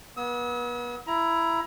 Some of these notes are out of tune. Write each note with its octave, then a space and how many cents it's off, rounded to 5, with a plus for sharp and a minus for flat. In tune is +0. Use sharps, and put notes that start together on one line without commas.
B3 -35 E6 -45
E4 +15 A#5 +25